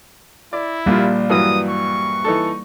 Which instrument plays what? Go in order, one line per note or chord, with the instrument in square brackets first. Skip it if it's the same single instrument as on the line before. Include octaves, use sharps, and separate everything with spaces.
[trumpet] E4 [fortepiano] D5
[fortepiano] A#1 F4 [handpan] G3 A#3
[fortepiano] G2 E3 F#3 [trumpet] D#6
[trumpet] C#6
[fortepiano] E3 D#4 A4